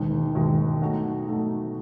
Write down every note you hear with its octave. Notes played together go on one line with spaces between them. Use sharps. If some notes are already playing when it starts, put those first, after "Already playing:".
Already playing: E1 D#2 D#3 G#3
E1 D#2 D#3 G#3
B2 F#3 A3 D#4 F#4
B2 F#3 A3 D#4 F#4